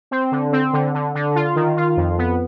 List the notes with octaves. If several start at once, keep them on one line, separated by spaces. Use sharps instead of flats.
C4
D3
C4
D3
D3
D3
F4
D#3
F4
F2
B3